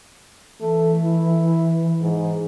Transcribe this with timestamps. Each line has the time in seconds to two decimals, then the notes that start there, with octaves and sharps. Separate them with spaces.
0.60 E3 A3
1.02 E4
2.01 G#2